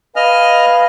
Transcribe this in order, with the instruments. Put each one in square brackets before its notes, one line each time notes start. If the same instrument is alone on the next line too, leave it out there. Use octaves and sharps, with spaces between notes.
[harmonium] B4 F5 G#5 [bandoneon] D#5 F6